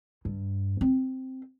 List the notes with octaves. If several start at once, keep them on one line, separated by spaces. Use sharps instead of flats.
G2
C4